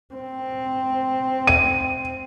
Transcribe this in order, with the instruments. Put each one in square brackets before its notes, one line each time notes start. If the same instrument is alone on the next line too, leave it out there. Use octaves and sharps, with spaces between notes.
[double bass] C4
[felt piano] D#7